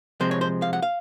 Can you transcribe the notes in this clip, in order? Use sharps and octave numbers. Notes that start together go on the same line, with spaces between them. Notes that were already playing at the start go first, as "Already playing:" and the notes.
C3 F3 G#3 C4 C5
C#5
C5
F5
F#5
F5